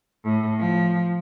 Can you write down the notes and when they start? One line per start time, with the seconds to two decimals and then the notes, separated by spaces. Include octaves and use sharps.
0.24 A2
0.60 F3